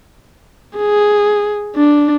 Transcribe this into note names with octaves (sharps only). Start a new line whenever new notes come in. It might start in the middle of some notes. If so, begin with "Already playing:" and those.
G#4
D4